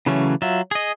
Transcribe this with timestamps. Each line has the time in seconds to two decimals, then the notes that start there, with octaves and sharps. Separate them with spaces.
0.06 C#3 E3 F#3 A3 C#4
0.42 F#3 F4 E5
0.71 G#4 D#5